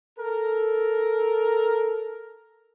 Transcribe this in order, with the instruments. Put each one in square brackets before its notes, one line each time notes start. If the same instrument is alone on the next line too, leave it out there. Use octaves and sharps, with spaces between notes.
[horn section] A4 A#4